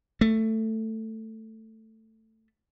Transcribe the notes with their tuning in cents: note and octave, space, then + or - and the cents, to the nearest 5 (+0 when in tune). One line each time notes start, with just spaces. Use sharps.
A3 +10